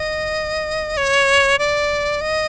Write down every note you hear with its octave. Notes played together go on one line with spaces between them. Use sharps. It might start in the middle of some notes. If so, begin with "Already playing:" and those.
Already playing: D#5
C#5
D5
D#5